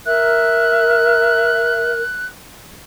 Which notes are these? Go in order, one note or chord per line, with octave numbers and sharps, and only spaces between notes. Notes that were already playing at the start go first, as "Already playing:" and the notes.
A#4 E5 F#6